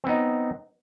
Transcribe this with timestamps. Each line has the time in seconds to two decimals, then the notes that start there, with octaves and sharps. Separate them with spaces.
0.04 C4
0.06 B3
0.09 D#4